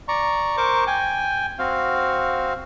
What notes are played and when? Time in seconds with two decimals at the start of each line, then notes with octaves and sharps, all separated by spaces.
0.08 D5 A#5 C#6
0.57 A#4 C5 C#6 D6
0.87 G5 G#5
1.59 C4 F#4 F5